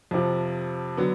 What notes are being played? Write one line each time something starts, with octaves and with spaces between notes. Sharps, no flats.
F2 C3 F3
D3 F#3 B3